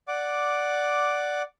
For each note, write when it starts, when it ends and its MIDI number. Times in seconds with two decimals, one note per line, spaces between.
0.08 1.42 74
0.08 1.42 78
0.08 1.42 86